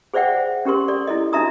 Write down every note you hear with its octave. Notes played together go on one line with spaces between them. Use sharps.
G#4 C5 D5 E5 F#5 G5
C#4 G4 A#4 C6
A4 D5
E4 A4 D#5
D4 D#4 F#4 E5 A#5 D#6